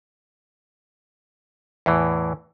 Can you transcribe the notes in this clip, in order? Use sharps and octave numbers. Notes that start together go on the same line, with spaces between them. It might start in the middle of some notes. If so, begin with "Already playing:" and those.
E2 A2 E3